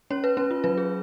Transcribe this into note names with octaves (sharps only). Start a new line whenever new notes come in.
C#4 C#5
B4
C#4 B4
F4
F#3 B4
G#4